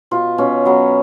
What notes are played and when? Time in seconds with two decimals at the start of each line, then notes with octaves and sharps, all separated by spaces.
0.11 B2 F4
0.38 B2 C#4
0.65 F#3 B3